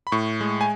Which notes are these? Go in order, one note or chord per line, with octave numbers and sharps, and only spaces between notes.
B5
A2 C#6
G#3
G#5